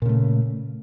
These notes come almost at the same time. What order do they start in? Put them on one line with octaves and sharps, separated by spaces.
A#2 C#3 A3